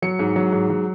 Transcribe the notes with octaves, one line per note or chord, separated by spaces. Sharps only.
F#3 C#7
G#2
F#3
G#2
F#3